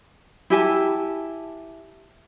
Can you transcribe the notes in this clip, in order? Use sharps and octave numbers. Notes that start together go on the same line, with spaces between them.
E4 G4 G#5 A5